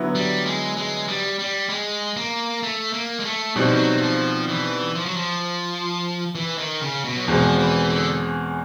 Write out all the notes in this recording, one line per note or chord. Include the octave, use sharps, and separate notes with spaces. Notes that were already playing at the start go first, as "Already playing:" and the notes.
Already playing: D3 F#3 B3 E4
G3
G#3
G#3
G3
G3
G#3
A#3
A3
A#3
G#3
A3
B2 F#3 G3 C4 D#4
F3
F#3
F#3
F3
E3
F3
F#3
F3
E3
D#3
C#3
B2
F#3
E2 B2 F3 G#3 C4
E3
D3